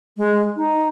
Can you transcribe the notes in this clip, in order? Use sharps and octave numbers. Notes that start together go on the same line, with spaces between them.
G#3
D#4